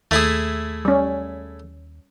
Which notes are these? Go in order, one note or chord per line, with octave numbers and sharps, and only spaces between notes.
D#2 A3 E4 G#4
G3 C#4